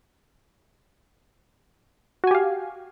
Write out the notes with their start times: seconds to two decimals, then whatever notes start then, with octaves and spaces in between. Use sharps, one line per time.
2.24 F#4
2.27 G#5
2.31 G4
2.35 F5